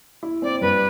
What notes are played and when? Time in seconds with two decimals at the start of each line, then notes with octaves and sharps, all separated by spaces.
0.23 E4
0.42 C4 D5
0.61 G2 B4